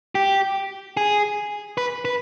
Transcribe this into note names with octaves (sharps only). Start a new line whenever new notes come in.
G4
G#4
B4
B4